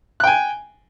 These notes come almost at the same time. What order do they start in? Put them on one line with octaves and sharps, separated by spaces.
F#6 G5 G#5